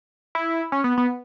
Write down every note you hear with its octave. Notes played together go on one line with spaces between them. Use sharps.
E4
C#4
B3
B3